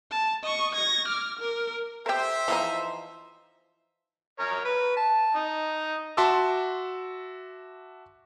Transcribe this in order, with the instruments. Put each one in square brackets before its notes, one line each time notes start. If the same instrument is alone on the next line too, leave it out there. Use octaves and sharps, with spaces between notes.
[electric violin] A5
D#5 C#6
G#6 A#6
D6 F6
A#4
[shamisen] G4 A#4 [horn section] C5 E5
[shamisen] E3 F3 D#4
[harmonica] A#4 C#5
B4
A5
D#4
[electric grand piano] F#4 E5 A5 C6 D6 E6